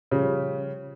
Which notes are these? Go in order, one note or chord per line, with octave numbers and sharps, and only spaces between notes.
C#3 F3 G3